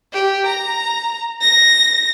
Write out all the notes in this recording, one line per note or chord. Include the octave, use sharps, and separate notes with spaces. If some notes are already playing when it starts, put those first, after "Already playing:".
G4
A#5
A#6